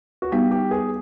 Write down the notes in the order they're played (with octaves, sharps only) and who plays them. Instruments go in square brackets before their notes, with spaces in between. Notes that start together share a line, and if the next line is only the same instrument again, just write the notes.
[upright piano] F#4
[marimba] G3 B3 D#4 [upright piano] G4
[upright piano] G4
G#4